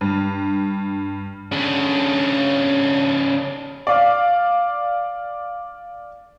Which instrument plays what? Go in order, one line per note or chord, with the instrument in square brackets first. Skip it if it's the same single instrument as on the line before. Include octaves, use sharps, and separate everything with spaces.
[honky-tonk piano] G2
[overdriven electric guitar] C#3 D4
[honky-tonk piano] D5 F5